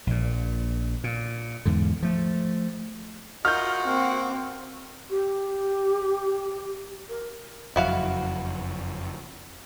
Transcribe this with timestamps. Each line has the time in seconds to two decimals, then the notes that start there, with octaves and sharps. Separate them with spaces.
0.07 A#1 A#2
1.04 A#2
1.65 E2 G#2 D3
2.03 F3 A3
3.45 F4 F#4 A#4 D#5 F6 G6
3.86 A#3 C4
5.09 G4
7.09 A#4
7.76 F#1 F2 F#3 E4 F#4 F5